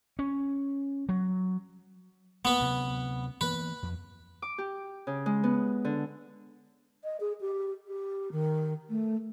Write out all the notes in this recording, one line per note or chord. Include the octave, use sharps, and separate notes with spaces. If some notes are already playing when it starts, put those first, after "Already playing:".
C#4
F#3
A#3 B3 B4
D2 C3 F#3
E3 A#3 B3 B4
F2
D6
G4
C#3
G#3
B3
D3
D#5
G#4
G4
G4
D#3
A3